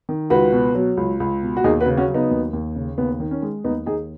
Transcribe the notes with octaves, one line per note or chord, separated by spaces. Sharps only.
D#3
C#2 F#4 B4
B2
F#3
C#2
C#2
B2
F#4
D#2 D#4 G#4
F#4 B4
C#3
C#4 F#4
F#3
B3 D#4
D#2
D#2
C#3
D#2 B3
D#3
C#4
G#3
D#2 B3 D#4
D#2 D#4 G#4